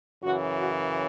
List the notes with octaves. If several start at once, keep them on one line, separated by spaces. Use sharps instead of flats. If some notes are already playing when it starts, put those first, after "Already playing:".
F#2 C#3 E3 F#4
F#4